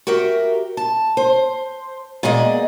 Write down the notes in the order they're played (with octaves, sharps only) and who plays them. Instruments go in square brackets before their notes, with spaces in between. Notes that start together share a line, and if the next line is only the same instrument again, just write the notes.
[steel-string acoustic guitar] F#4 G4 A#4 E5
A5
C5
A#2 G#3 B3 G#4 D5 D#5